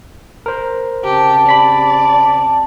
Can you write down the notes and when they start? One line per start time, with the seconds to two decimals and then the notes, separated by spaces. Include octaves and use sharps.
0.46 A#4 C5
1.04 C#3 C4 G4 A5
1.49 D5 B5 B6